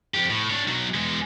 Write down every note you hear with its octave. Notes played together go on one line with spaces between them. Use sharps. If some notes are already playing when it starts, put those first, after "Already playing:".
F2 G4
A2
D4 C#5
B1 F#3
E2 G#3